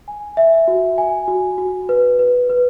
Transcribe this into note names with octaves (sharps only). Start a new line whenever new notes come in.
G#5
E5
F#4
G#5
F#4
F#4
B4
B4
B4